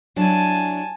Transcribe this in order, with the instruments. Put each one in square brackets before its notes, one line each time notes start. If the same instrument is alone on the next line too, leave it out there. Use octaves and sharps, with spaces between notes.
[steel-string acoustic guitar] F#3 D4 E4 [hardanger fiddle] G#5 A5